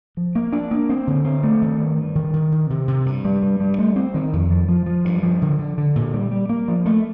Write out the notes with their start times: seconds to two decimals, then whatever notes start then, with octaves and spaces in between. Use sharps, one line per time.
0.17 F3
0.35 A#3
0.53 D4
0.71 A#3
0.90 C4
1.07 D3
1.25 C4
1.43 A3
1.62 D#3
1.80 G2
1.98 G2
2.15 D#3
2.33 D#3
2.52 D#3
2.70 C3
2.88 C3
3.06 G2
3.25 G3
3.43 G2
3.60 G3
3.79 A3
3.96 C4
4.14 D#3
4.33 F2
4.51 F3
4.69 F3
4.86 F3
5.05 G2
5.23 F3
5.42 D3
5.59 D3
5.78 D3
5.96 A#2
6.14 G3
6.31 G3
6.49 A#3
6.68 F3
6.86 A3